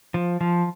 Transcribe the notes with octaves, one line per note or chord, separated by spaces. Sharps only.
F3
F3